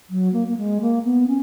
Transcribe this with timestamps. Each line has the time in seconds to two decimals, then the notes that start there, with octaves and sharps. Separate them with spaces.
0.10 F#3
0.33 A#3
0.48 A#3
0.57 G#3
0.81 A#3
1.04 B3
1.27 C#4